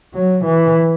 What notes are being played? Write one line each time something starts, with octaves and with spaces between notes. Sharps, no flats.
F#3
E3